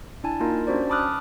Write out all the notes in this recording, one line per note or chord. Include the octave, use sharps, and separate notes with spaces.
D4 E4 G#5 A5
A#3 D#4 F4 A#4
C#4 D4 F#4 C5 D5
A5 B5 D6 D#6 F6 F#6